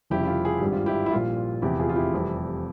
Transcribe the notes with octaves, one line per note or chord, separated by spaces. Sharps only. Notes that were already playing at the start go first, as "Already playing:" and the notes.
F1 F2 C#3 G3 E4 G4
E4
F4
G#4
G#1 G2 G3 G4
F4
E4 G4
E4
A#1 A#2 G3 F4
F1 E2 C3 F3 E4 G4
F4 G#4
F4
E4 G4
F1 F2 E3 G3